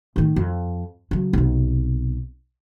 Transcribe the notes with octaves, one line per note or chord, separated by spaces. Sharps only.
A1 D#3
F2
C#3 F#3
B1 C3